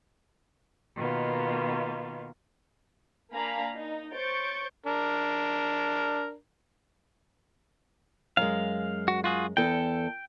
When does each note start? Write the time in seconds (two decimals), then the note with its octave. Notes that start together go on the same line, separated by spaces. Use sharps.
0.97 B2 D#3 A#3 B3 F4
3.32 A#3 D4 F5 G#5 A#5 B5
3.75 D#4
4.14 C5 C#5 C#6 G6 A6 D7
4.86 D4 A#4
8.37 F#2 G#3 F5
9.08 F#4
9.24 F4 F#4 G#4
9.57 E2 A4 G5